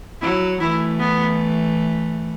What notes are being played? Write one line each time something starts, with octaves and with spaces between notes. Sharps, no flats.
F#3 E4
E3 A3 E4
B3